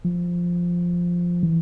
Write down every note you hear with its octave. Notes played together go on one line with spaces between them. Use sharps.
F3
E3